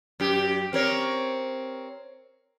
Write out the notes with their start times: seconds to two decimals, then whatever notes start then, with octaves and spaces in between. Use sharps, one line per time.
0.20 F#2 G4
0.73 C4 A#4 C#5